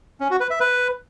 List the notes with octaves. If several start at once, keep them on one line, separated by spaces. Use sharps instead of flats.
C#4
F#4
B4
E5
B4